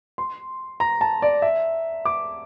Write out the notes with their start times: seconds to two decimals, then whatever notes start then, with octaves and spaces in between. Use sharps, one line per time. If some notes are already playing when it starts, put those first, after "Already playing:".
0.18 C6
0.80 A#5
1.01 A5
1.22 D5
1.42 E5
2.05 D6